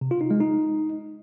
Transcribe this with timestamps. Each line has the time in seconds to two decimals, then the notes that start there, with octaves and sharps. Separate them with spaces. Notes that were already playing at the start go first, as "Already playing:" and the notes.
0.01 C3
0.11 F4
0.21 D#4
0.31 G#3
0.40 D#4